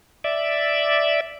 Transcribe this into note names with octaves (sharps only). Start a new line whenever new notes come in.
D5 E5